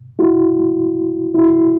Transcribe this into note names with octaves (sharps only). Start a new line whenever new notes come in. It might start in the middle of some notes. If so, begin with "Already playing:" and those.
E4 F#4
E4 F#4